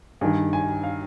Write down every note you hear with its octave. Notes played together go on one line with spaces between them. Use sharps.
G2 D#3 G#5
G#5
F5